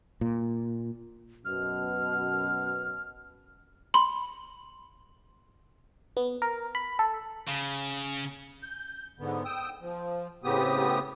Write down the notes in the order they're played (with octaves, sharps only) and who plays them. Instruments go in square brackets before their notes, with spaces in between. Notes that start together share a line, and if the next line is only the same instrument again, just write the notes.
[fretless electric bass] A#2
[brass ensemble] F#2 B2 [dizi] F6
[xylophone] B5 C6
[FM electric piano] B3
A#4
B5
A4
[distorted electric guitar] C#3
[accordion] G6
G#2 D3 B3
G5 D#6 E6
F3
A2 C#3 B3 C4 G4 D#6